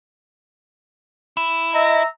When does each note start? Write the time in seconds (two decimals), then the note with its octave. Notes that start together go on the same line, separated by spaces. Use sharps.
1.37 E4
1.74 D#5 E5 A#5